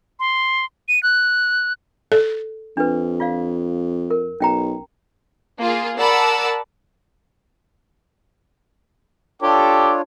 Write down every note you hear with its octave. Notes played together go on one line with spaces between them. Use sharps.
C6
D#7
F#6
A4
F2 D4 B4
F4 D5 F5
A#4
B1 C#4 G5 A#5
A#3 F4 G#4
A#4 D5 F#5 A5 B5 E6
D4 F4 A4 C#5 G5 D6